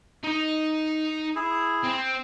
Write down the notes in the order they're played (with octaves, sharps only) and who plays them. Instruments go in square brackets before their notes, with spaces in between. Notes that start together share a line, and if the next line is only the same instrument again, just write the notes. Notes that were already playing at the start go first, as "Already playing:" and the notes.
[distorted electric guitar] D#4 D#5
[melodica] E4 G#4
[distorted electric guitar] C4